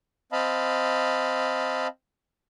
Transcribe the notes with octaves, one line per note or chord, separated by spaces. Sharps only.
C4 D#5 F5 A5 B5